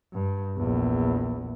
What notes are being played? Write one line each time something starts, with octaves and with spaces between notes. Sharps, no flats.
G2
A#1 E2